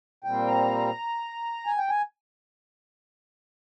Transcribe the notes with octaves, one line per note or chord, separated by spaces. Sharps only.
A#2 G3 C4 G5
A#5
G#5
G5
G#5